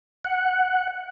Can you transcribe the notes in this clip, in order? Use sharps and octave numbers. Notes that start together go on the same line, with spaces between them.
F#5